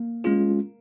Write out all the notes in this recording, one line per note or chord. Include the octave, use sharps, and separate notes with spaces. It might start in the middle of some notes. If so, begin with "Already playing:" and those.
Already playing: A#3
G#3 C#4 F4 G#4